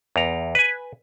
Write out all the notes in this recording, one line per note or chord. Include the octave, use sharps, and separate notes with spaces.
E2 A#5
B4 G#5